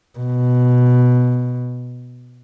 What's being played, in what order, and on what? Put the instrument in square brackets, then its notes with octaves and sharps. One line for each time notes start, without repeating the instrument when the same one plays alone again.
[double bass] B2